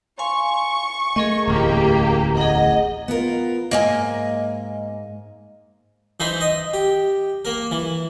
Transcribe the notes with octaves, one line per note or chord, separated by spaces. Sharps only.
F5 G#5 C6 C#6
A3 G#4 A#4 D#5
D1 A1 E2 A#3 G4
G#4 D#5 F#5
B3 F4 A#4
G#2 A#3 D#5 G#5
E3 D#4 C5 E5
D#5
G4
A#3 A#4
E3